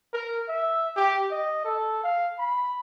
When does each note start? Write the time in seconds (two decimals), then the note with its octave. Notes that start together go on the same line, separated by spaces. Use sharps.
0.13 A#4
0.48 E5
0.97 G4
1.31 D#5
1.65 A4
2.04 F5
2.39 B5